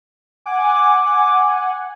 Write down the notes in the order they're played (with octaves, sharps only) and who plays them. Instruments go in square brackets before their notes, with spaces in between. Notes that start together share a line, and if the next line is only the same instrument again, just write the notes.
[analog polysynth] F#5 G#5 [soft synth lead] D6